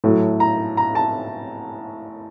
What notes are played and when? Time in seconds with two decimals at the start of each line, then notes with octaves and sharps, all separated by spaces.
0.04 A2 F#3 A3
0.40 A#5
0.77 A#5
0.95 A5